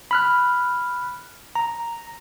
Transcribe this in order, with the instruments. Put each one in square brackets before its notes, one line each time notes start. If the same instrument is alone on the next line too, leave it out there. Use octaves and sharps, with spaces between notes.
[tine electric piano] B5 F6 F#6
A#5